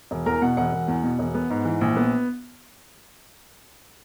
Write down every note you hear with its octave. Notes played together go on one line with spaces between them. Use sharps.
E1
E2 A#4 A#5
B2 F#5
E1 F#5
E1
E2
B2
E1
B3
G#2
E3
A#1
B3